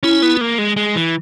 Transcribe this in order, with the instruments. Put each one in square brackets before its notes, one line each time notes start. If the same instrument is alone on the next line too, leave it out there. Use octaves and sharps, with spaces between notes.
[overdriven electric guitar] C#4 [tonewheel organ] E4
[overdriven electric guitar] B3
A#3
G#3
G#3
E3